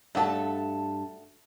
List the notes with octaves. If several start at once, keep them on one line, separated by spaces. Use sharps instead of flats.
G2 A3 F#4 A4 A5